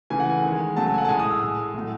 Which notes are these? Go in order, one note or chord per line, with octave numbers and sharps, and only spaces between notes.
C#3 E3 A3 G#5
F#5
G#5
D#3
G#3
C#3 F#3 A3 A5
A5
G#5
F#5
A5
A2 G#3 G#5
D#6
E6
A2 G#3
A2 F#3 A3